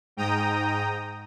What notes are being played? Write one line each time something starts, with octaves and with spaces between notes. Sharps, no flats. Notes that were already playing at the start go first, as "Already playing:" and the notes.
G#2 G5 A#5 D#6